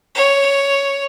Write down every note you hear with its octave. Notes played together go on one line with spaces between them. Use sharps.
C#5